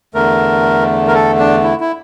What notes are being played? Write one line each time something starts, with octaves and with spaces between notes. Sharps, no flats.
E2 D3 A3 A#4
A#4
A4
D4
E4
E4